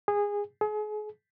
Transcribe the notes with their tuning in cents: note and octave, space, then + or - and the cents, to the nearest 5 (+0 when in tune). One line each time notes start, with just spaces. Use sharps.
G#4 -20
G#4 +35